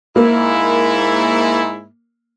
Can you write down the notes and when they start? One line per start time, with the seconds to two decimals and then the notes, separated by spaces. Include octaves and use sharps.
0.16 G#2 A#3 E4